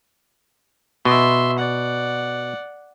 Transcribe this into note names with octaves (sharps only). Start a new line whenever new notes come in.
B2 E5 C6
D5 F#5